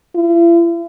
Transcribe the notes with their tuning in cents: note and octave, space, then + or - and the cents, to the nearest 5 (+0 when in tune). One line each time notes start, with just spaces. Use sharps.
E4 +45